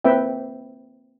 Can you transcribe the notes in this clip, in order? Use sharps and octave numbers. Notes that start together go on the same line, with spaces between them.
A#3 C4 B4 E5 G5